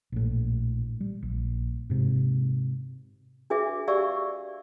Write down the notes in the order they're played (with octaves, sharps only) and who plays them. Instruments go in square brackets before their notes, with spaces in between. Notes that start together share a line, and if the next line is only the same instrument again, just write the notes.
[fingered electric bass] A#1 A2
G3
A#1
G#2 C3
[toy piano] D4 F#4 G#4 B4 E5 D6
G4 D5 E5 F5 C#6 E6